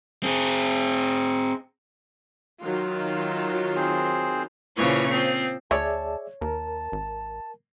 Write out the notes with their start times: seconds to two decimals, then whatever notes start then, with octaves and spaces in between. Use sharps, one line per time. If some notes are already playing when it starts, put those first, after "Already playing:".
0.23 C4 G#4
2.64 D#3 F#3 F4
3.76 C4 G#4 C5
4.77 A#2 C#3 E3 F3 C#6
5.10 F3 C4
5.71 D2 G#4 C#5 D5 E5 A5
6.41 D#2 A#4 A5
6.92 G#1